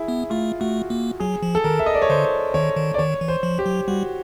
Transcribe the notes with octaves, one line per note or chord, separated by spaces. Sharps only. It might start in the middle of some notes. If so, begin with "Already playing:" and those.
Already playing: E4 G#4
B3
A3 F4
A3 F#4
A#3
F#3 G#4
F3
A4
D#3 A#4
E5
D#5
D5
C#5
D3 C5
D#3 C#5
D#3
D5
D#3 C#5
E3
C5
F3
G4
F#3
G3 F#4